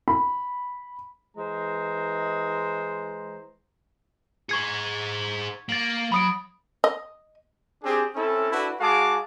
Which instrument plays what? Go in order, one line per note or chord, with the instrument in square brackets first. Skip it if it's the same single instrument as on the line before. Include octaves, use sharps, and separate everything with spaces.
[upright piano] B5
[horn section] E3 G#3 C5 A#5
[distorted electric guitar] G#4 C5 [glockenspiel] C#6 G#6 C#7
[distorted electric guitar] A#3 [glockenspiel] A6 F#7
[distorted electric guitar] F#3 [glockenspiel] B5 D#6 D7
[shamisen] D#5
[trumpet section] C4 D4 G4 G#4
C4 C#4 E4 A4
D4 E4 F#4 A4 B4
G#3 F#4 G#4 F5 A5 D6